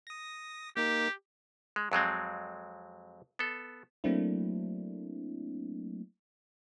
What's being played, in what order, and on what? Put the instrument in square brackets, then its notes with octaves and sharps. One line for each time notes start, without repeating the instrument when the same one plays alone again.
[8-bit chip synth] D#6 A#6
[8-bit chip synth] A#3 D#4 A#4 [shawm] G4
[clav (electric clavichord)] G#3
F2 F#3 G#3 C4
B3 A4
[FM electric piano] F#3 A3 A#3 C4 D4 E4